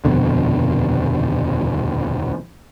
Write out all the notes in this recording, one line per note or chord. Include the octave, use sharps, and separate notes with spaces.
D#1 F2 B2 D3